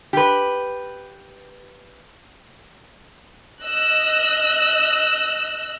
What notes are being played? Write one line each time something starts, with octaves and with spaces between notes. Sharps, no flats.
G4 B4
D#5 E6 F#6